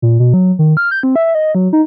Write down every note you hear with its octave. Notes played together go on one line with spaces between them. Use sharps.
A#2
B2
F#3
D#3
F6
G6
C4
E5
D#5
F#3
D#4